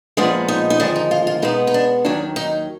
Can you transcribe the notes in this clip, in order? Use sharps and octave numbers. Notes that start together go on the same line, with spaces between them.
A#2 F3 G#3 B3 D4
D#4
D#4
D#2 D3 F3 G#3 D4
D#4
F4
F4
B2 G#3 B3 D#4
D#4
D4
D#2 D#3 F#3 D4
D#4